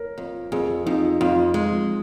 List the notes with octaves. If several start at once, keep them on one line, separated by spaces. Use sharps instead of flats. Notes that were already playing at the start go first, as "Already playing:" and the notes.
Already playing: A#4 C#5
F2
F2 G#4
F2 D#4
F2 F4
G#3